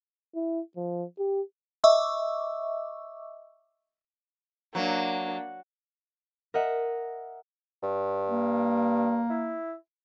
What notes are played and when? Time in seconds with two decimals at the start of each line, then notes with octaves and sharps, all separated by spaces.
0.35 E4
0.76 F3
1.19 G4
1.84 D#5 E5 C#6 D6 E6
4.75 F#3 A#3 D4
6.54 A#4 D#5 E5 F#5
7.83 G2
8.27 A#3
9.30 E4